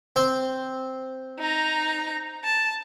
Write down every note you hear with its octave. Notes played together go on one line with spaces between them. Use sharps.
C4 C5
D#4 A#5
A5